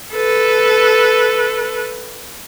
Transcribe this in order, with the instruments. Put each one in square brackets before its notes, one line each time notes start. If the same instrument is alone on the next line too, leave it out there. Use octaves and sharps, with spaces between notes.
[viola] A4 B4